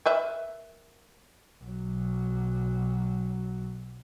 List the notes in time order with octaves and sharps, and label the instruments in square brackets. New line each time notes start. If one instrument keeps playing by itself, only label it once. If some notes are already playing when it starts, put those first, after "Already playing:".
[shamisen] A#4 B4 E5
[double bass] B1 F#3